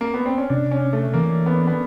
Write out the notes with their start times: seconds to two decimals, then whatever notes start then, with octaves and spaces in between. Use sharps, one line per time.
0.01 A#3
0.14 B3
0.26 C4
0.38 C#4
0.49 C3 D4
0.71 C#4
0.93 A3
1.14 E3 A#3
1.46 B3
1.68 B3